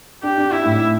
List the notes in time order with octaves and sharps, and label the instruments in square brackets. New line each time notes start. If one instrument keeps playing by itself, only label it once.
[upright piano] D4 [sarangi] G4
[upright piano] D4
[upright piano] D4 [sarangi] E4
[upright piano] A2